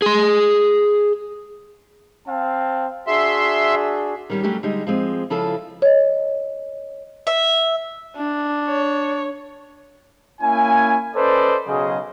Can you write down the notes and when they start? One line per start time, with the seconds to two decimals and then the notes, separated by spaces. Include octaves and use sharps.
0.02 G#4 C6
2.27 C4 F5 A5
3.07 D4 F#4 G#4 E5 C6
4.30 D#3 G3 C#4
4.43 F#3 G3 A3 C#4 D4 G4
4.63 D3 G3 G#3 D#4 G#4
4.87 F3 G#3 C4
5.30 C#3 F3 E4 F4 A4 A5
5.82 C#5 D#5
7.27 E5
8.16 D4
8.68 C#5
10.41 A#3 C#4 E4 G#5
11.15 C#4 A4 B4 C5 D5 D#5
11.66 B1 C#3 F#3 G#4 C5 D#5